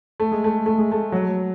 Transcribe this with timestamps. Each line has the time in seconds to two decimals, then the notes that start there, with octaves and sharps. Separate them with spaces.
0.20 A3
0.31 G#3
0.44 A3
0.66 A3
0.78 G#3
0.92 A3
1.12 F#3